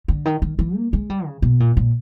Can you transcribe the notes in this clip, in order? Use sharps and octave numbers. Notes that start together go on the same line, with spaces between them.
D3
D#3
D#3
E3
A#3
G#3
G3
C#3
B2
A#2
A#2